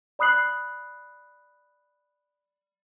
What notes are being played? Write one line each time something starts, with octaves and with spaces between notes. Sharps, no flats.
D5 B5 D#6 F#6 C7 F#7